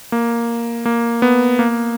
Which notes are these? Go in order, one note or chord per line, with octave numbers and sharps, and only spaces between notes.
A#3
A#3
B3
A#3